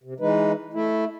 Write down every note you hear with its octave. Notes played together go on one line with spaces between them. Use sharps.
C3
E3 G#3 D#4 B4
A3 E4